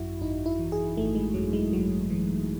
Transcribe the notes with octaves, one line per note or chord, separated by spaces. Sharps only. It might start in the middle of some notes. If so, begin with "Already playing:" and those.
Already playing: G#1 F#2 E4 F#4
G#1 D#4
E4
E3
G#4
G#1 A3
G#3
F#2 F#3
G#3
G#1 F#3
E3